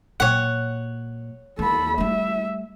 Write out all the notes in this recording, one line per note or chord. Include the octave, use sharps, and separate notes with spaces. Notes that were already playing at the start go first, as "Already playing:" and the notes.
A#2 F#3 C#5 F#5
D#2 A4 B5
G3 A3 E5